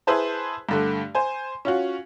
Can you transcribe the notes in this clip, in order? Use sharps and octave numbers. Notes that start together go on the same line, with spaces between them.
E4 G#4 B4 C5 A5
G2 D3 A3
C5 G#5
C#4 F4 F#4